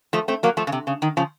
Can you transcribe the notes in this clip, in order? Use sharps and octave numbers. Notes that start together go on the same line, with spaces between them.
F3 A3
A3 C4
F#3 A#3
F3 A3
C#3
C3
C#3
D#3
C#3 F3